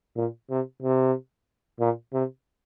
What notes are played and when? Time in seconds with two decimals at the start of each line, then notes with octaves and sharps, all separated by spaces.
0.16 A#2
0.50 C3
0.83 C3
1.80 A#2
2.13 C3